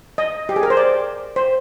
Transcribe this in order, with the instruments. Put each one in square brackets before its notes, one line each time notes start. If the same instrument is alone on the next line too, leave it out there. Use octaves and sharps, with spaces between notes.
[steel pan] D#5
G4
G#4
A#4
C5
D5
C5